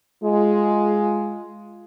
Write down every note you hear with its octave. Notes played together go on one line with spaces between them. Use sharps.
G#3 F4